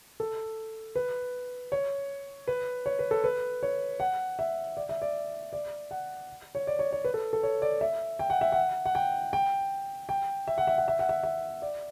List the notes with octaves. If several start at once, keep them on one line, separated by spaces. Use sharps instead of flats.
A4
B4
C#5
B4
C#5
B4
A4
B4
C#5
F#5
E5
D5
E5
D5
D5
F#5
C#5
D5
C#5
C#5
B4
A4
A4
C#5
D5
E5
G5
F#5
E5
F#5
F#5
G5
G5
G5
E5
F#5
E5
F#5
E5
F#5
E5
E5
D5